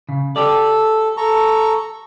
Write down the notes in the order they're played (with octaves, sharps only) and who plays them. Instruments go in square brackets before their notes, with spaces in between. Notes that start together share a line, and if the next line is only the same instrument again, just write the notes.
[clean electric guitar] C#3
[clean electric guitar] G4 D5 [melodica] A4
[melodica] A4 A#5 C#6